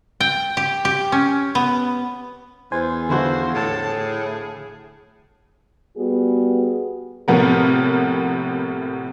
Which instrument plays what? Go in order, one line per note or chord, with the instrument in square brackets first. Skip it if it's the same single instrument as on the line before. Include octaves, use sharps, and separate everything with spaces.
[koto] G5
G4
G4
C#4
B3
[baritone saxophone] E2 [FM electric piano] C5 G#5 C6
[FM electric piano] D3 [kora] F3 E4 F#4 [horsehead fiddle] C5
[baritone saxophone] A2 [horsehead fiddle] A4 A5
[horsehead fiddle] G#4
[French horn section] G3 B3 F#4 G#4
[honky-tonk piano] A2 C3 F3 B3 A#4